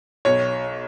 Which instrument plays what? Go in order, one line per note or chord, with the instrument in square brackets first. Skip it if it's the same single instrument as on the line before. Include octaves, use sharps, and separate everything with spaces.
[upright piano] B1 C#5